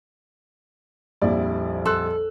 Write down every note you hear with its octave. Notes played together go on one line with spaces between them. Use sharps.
A#1 F2 G3 E4 D5
A4 C6 E6 F#6